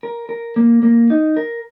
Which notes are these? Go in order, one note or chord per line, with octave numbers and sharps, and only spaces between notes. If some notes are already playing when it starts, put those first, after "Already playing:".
A#4
A#4
A#3
A#3
D#4
A#4